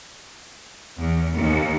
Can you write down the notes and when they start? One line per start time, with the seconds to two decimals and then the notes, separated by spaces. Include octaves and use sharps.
1.01 E2
1.36 D#2